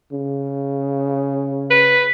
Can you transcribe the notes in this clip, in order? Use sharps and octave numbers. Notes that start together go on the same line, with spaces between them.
C#3
B4